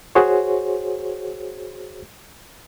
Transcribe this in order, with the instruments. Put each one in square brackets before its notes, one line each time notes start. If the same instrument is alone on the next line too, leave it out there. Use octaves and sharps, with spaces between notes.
[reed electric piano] F#4 G#4 C5 C#5